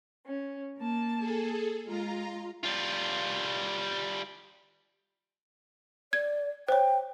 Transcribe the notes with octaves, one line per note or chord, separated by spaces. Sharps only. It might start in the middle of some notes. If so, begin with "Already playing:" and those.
C#4
A#3 A5
G#4 A4
G#3 F4 A#5
G3 F4
D5 G#6
C5 C#5 G5